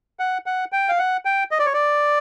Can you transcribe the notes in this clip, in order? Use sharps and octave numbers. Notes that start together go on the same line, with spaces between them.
F#5
F#5
G5
F5
F#5
G5
D#5
D5
C#5
D5